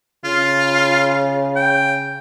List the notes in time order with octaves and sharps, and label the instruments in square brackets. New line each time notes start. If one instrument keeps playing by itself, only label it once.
[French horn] C#3 [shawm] F4
[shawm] G5